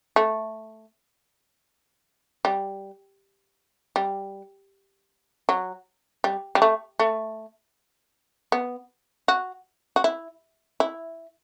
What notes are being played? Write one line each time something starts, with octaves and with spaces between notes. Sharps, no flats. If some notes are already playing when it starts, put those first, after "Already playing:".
A3
G3
G3
F#3
G3
G3
A3
A3
B3
F#4
F#4
E4
E4